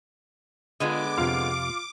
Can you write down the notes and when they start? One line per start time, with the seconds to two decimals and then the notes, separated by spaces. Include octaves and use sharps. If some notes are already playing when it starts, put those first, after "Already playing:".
0.80 D3 G#3 B3 F4 D#5 D6
1.18 F2 C3 F4